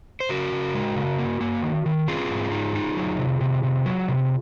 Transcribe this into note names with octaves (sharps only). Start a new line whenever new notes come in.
C5
C#3 F#4 A#4
C#3
G#3
C#3
A#3
A#3
D#3
D#3
C4 F4 G#4
G#2
D#4
D#4
F#3
C3
C3
C3
F#3
C3